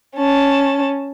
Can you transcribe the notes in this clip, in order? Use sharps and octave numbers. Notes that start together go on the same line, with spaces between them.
C#4 A5